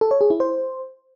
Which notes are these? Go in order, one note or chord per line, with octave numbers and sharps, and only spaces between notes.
A4
C#5
G#4
E4
C5